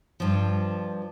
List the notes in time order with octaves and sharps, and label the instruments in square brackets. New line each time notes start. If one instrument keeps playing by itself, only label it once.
[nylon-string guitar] G2 F3